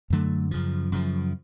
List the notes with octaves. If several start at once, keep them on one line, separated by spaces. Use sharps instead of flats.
F#2 D3 F#3 A3
F#2 C#3 F3
F#2 C#3 F3